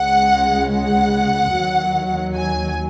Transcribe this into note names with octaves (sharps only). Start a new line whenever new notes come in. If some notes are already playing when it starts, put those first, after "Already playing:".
Already playing: C#2 C#3 G#3 F#5
F#5
D#2 D#3 F#3
G#5